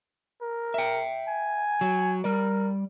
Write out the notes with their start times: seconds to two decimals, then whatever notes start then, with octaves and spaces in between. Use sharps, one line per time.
0.42 A#4
0.74 E5 G5
1.28 G#5
1.81 F#3
2.24 G3 A#4 D5